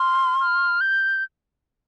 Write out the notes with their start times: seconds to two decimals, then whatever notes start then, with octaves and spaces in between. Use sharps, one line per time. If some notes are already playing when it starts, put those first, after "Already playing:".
Already playing: C6 F6
0.40 F6
0.81 G6